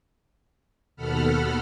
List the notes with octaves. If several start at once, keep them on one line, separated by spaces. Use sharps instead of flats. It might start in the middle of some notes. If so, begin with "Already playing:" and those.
D#2 B2 A4 F#5 B5 F6